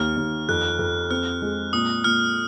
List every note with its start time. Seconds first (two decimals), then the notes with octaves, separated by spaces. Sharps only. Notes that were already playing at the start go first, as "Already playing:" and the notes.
Already playing: D#2 F6
0.17 D#2
0.49 F2 F#6
0.79 F2
1.10 C4 F6
1.42 G#3
1.73 A#2 D#6
2.04 A#2 F6